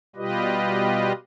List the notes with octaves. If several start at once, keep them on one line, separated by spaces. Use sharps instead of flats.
B2 G3 F4 G4 B4 D#5